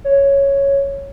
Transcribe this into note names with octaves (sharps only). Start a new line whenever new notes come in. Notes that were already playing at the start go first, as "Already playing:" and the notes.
C#5